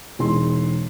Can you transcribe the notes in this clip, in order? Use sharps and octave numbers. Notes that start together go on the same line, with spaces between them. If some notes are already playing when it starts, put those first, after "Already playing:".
E1 D#4 E4 G#4 C6